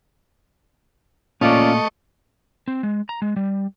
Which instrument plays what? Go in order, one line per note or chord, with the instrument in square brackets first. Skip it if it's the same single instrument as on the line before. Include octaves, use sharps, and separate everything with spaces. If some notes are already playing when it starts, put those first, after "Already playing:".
[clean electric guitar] A#2 [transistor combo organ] A3 D#5 C#6 [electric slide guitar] C#4 F4 D5
[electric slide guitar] C4
G#3
A#5
G#3
G3